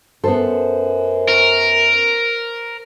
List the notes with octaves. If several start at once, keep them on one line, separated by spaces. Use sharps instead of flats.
F#2 B3 A4 C5
A#4 C#6